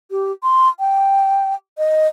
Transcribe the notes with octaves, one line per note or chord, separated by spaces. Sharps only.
G4
C6
G5
D#5